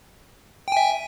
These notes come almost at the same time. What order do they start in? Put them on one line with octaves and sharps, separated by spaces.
G5 G#5 E5